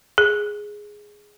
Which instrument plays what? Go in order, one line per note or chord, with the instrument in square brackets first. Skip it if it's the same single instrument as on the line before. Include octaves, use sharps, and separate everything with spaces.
[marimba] G#4